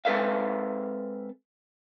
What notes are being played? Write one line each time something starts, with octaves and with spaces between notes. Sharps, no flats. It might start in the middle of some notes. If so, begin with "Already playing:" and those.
G#3 C4 A4 B4 E5 F5